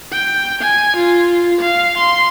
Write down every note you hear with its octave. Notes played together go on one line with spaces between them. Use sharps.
G5
G#5
F4
F5
C6